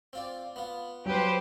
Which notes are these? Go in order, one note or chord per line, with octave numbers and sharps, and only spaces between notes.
C4 F4 D5
B3 F4
F#3 G4 B4 C5